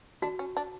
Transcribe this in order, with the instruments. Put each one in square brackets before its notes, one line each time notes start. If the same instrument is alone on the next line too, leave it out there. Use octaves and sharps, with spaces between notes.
[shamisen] D4 [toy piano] F#4
[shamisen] C#4
D4